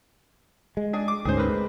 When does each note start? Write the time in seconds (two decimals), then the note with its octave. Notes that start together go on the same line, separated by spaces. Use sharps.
0.77 G#3
0.93 D4 G#4
1.08 D6
1.25 D2 G#2 C#4 G#4 C5
1.37 A#3 C4 B4
1.49 G#3